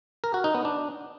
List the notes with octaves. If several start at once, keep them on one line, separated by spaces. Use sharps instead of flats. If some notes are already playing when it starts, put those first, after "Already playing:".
A#4
F#4
D#4
B3
D4